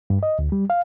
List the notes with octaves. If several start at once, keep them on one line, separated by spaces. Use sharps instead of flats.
G2
D#5
D2
G3
F5